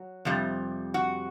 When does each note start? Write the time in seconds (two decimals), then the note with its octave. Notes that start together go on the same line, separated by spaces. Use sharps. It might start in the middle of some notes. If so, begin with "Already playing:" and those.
Already playing: F#3
0.25 F2 C3 G3
0.94 F#4